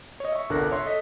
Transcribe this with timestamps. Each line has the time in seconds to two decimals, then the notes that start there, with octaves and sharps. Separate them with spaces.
0.20 C#5 D#5
0.32 E5 C#6
0.49 G1 C2 D3 A#4 F#6 A#6
0.72 C#5 E5 C6
0.86 A4 D#5 B6